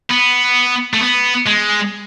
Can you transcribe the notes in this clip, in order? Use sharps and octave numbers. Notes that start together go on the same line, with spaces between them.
B3
A3
B3
G#3